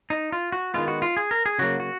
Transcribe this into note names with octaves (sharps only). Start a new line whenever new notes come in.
D#4
F4
F#4
D#3 G#3 B3 F4
F#4
F4
G#4
A#4
G#4
C#3 F#3 A#3 F#4
F#4